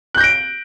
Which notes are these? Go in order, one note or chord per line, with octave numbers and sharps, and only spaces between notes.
F#6 G6 A#6 D7